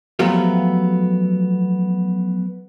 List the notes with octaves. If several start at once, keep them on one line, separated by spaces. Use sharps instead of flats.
F3 F#3 A3 B3 F4 G4